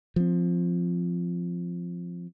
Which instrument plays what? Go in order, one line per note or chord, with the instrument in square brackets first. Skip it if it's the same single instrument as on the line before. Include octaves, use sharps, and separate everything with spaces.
[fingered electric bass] F3 C4